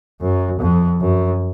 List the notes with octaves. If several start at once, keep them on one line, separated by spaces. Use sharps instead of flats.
F#2
F2
F#2